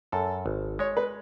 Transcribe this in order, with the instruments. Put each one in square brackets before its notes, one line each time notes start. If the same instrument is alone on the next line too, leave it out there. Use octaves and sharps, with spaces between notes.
[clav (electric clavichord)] F#2 [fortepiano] A4
[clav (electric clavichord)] G#1
[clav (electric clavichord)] G#3 [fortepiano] C#5
[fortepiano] B4